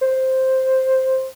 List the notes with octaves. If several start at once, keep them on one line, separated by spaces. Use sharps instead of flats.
C5